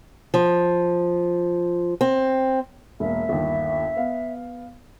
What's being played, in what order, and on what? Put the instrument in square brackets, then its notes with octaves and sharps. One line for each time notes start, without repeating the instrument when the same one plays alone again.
[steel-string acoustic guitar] F3
C4
[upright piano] E1 A#3 [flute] E5
[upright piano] G1 D#2
B3 F5